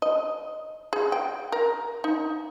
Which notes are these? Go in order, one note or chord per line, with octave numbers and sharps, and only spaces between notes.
D#5
G#4
G5
A#4
D#4